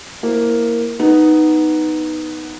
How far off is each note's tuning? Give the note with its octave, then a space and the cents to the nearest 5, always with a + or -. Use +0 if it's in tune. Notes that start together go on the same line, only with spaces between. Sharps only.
A#3 +0 E4 +0 C5 +0
B3 +0 D#4 +0